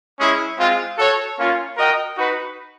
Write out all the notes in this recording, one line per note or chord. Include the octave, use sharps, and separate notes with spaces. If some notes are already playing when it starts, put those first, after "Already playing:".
G#3 C#4 E4 G#4
G#3 C4 F4
F#4 A4 C#5
A#3 C#4 F4
F#4 A#4 D#5 G5
D#4 F#4 B4